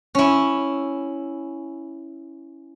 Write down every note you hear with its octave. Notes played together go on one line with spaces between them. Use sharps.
C#4 E4